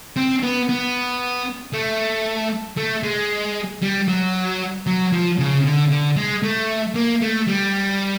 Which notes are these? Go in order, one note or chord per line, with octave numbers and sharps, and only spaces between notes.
C4
B3
B3
A3
A3
G#3
G3
F#3
F#3
F3
C#3
D3
D3
G#3
A3
A#3
A3
G3